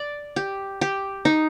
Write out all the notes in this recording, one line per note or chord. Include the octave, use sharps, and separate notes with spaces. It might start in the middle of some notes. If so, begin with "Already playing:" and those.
Already playing: D5
G4
G4
D#4